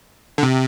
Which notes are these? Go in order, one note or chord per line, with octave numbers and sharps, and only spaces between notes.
D3
C3